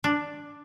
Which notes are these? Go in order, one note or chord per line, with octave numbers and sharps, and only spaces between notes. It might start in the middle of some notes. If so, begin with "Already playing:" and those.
D4